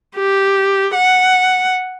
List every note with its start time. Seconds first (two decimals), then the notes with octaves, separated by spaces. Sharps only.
0.16 G4
0.94 F#5